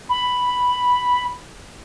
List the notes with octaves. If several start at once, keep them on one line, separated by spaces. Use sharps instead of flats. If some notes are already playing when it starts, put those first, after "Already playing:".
B5